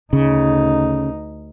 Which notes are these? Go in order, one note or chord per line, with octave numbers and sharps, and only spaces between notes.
D2 C#3 D#4